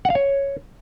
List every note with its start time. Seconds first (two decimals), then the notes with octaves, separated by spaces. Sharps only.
0.05 F#5
0.10 F5
0.15 C#5